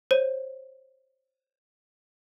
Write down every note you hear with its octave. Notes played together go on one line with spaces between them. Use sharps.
C5 C#5 D#7